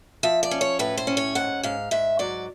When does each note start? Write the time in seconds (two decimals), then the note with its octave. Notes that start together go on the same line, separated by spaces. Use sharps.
0.23 F3 E5
0.43 D5
0.51 C#4
0.61 C#5
0.79 A2 B4
0.97 C5
1.07 C#4
1.17 C#5
1.35 G#2 F#5
1.63 G#2 F5
1.91 G#2 E5
2.19 F#3 D5